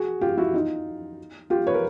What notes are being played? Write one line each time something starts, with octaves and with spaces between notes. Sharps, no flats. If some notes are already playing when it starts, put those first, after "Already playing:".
Already playing: F#4 G#4
F4 G4
E4 F#4
D#4 F4
F4 G4
B4 C#5
A#4